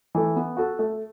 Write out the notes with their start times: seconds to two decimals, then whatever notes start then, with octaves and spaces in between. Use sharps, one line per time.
0.15 E3 A3
0.36 B3
0.57 F#4 A4
0.79 A3